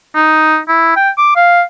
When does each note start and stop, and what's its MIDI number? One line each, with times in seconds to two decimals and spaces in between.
0.15 0.58 63
0.68 0.96 64
0.96 1.10 79
1.18 1.35 86
1.36 1.62 77